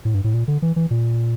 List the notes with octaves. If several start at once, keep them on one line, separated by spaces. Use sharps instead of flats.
A2
G2
A2
A#2
D3
E3
E3
A#2